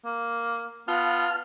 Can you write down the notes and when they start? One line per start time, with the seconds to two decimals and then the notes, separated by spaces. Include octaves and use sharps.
0.05 A#3
0.88 B3 F4 F5 A5 F6